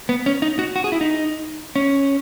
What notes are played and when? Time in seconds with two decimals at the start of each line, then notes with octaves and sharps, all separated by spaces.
0.09 B3
0.26 C#4
0.42 D#4
0.59 F#4
0.76 F#4
0.84 G#4
0.92 E4
1.01 D#4
1.76 C#4